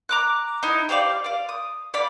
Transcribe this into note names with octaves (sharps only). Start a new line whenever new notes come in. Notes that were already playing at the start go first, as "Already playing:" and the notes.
A#5 D6 F#6
D#4 E4 A#5
G4 C5 D5 F5
D5 F5
D#6
D5 F5 B5